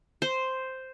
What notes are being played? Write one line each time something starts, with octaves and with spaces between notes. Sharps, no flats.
C5